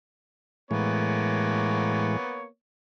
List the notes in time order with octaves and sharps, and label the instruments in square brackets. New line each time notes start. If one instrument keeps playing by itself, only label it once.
[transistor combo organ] A2 E3 G#3 [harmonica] A#3 B3 C#5